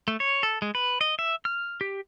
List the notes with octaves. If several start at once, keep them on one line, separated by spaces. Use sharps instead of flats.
A3
C#5
A4
G#3
B4
D#5
E5
F6
G4